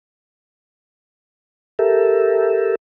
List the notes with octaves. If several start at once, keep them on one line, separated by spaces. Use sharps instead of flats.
G4 A4 A#4 E5